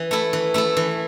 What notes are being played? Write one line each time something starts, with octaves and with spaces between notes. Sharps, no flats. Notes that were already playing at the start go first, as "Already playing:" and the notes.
Already playing: E3
A3 E4 A4
E3
A3 E4 A4
E3